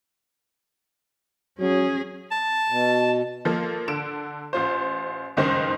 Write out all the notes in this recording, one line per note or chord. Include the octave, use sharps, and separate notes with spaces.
F#3 C#4 G#4
A5
B2
F3 A#3 A4
D3 A4 D7 E7
A1 F4 C5
F#1 C#2 G2 D#3 D#4 C5